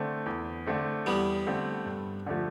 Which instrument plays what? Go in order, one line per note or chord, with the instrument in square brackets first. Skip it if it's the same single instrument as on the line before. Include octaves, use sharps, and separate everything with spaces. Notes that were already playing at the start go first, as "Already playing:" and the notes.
Already playing: [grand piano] D3 A3 C4
E2
D3 A3 C4
[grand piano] E2 [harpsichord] G3 B3
[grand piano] D3 A3 C4
G2
D3 F3 A3